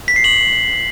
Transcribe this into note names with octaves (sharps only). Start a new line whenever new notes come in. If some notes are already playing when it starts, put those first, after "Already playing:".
B6
C7
F#7